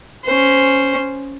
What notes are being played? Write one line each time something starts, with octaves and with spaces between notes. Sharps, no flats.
C#4 C5